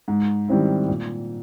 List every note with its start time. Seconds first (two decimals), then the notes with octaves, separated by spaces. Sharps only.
0.08 G#2
0.48 D#3 G3 C4 E4
0.88 A#2